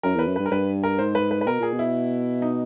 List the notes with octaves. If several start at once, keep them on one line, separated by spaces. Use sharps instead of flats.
F#2 A#4
E2 B4
F#2
G2 B4
A#4
G2 B4
A#4
G#2 C5
B4
B4
B4
B2 A#4
A#2 G#4
B2
E4
D#4